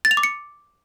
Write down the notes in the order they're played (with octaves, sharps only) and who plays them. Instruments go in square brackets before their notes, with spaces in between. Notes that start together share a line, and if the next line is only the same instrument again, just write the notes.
[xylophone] A6
F7
D6
C#7